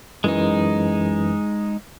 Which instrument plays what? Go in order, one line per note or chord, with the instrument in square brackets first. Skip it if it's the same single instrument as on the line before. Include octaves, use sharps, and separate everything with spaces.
[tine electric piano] F#2 E3 [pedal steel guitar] G#3 D#4